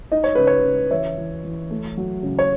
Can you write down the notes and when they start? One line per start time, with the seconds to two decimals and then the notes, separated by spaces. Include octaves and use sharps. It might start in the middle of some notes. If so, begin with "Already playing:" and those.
0.12 D#4 D#5
0.24 C#5
0.35 C#3 B4
0.47 C#5
0.64 C#3
0.91 E3 C#5 E5
1.18 E3
1.44 E3
1.71 A3
1.97 F#3
2.23 C#3
2.39 C#5